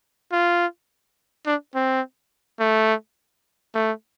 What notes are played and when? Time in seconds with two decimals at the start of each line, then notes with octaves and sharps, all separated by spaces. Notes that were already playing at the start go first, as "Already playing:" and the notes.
0.32 F4
1.47 D4
1.75 C4
2.60 A3
3.75 A3